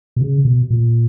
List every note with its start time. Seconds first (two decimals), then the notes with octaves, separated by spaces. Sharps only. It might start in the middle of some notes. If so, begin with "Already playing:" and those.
0.16 B2
0.21 C#3
0.45 B2
0.70 A#2